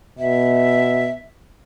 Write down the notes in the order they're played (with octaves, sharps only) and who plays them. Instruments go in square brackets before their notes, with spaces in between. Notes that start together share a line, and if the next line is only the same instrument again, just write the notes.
[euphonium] B2 [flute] E5